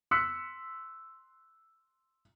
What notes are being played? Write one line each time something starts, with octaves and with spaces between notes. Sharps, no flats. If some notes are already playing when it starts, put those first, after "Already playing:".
C6 E6 F#6 B6 C#7